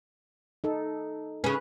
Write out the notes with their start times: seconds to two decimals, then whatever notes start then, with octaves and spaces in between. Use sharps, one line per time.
0.64 D#4 A4
1.44 C#3 C#4 B4